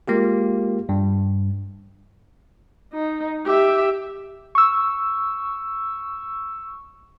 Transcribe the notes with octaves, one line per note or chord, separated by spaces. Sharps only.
G#3 A#3 F4 G4
G2
D#4
G4 E5
C#6 E6